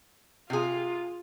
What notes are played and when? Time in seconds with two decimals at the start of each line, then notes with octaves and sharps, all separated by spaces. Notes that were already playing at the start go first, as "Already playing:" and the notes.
0.50 C3 F4 G#4